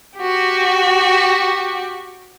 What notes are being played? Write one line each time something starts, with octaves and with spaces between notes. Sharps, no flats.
F#4 G4